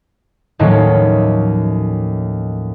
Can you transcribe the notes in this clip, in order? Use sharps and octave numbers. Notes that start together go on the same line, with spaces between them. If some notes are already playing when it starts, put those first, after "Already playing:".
D#2 A2 D#3 F3 F#3 C#4